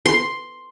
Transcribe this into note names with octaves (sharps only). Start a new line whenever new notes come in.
C6